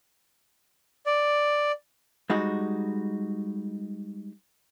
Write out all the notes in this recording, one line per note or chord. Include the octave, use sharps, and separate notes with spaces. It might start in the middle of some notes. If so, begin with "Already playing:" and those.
D5
G3 G#3 D#4 F#4